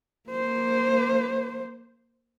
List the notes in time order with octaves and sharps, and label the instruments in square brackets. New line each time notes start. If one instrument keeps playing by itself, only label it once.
[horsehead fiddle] A#3 C5